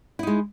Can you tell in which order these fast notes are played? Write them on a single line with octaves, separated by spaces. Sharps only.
E4 D#4 G#3